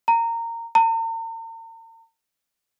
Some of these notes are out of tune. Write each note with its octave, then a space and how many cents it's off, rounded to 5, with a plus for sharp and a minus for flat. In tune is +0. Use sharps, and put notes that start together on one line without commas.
A#5 -20
A#5 -45